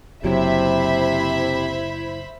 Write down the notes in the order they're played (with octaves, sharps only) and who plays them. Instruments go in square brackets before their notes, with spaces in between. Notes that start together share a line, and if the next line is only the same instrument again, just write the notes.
[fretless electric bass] F#1 F#3 [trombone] C3 [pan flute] E4 [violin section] C5 E5 B5